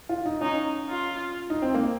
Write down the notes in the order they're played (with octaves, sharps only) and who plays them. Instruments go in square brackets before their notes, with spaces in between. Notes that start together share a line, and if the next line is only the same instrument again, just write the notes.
[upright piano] F4
D#4
[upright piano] C#4 [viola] D#4
[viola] F4
[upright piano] D#4
C4
A#3